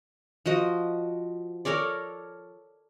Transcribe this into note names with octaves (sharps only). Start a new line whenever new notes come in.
F3 F#4 D#5
A4 A#4 C#5 D5